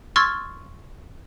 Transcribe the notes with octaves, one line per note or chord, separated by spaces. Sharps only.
C6 C#6 E6 F6 G#6 A6